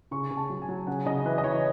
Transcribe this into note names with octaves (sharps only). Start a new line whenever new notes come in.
C#3 C#6
C#3
A5
F#3
G#5
F#3
C#3 F#5
C#3 D#5
E3 B4
D#5
E3 C#5